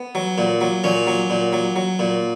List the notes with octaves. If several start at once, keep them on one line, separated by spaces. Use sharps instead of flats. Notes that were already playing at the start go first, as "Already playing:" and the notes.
Already playing: B3
F#3
A#2
F#3
A#2 C#4
F#3
A#2
F#3
F#3
A#2